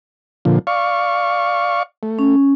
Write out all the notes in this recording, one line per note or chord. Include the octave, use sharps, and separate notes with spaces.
A#2 D3 F3
D5 F5 C#6
A3
C#4